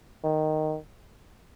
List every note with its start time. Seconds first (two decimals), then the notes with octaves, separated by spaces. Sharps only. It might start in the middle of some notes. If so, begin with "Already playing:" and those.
0.24 D#3